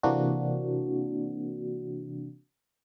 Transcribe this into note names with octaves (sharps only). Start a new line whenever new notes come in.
C3 E3 A#3 C4 D4 F#4